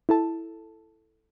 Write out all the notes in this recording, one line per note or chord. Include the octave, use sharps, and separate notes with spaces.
E4 A4 A5